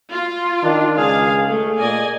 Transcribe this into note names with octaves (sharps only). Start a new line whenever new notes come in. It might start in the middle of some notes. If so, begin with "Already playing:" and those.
F4
D#3 D4
C#2 G#4 F5
A3 G#4
A#2 D5 D#5 G#5